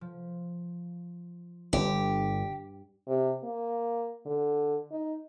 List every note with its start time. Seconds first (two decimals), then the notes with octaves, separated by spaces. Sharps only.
0.01 F3
1.73 G1 G2 G4
3.08 C3
3.43 A#3
4.26 D3
4.91 D#4